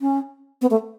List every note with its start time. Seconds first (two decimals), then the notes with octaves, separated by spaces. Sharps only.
0.01 C#4
0.62 B3
0.71 A3